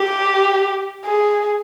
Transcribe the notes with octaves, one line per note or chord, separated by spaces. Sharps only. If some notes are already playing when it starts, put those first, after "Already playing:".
Already playing: G4
G#4